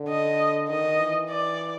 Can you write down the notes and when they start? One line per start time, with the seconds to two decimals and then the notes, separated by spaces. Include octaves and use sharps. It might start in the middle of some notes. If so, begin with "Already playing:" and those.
Already playing: D3
0.09 D#5
0.69 D#3 D#5
1.00 E3
1.30 D5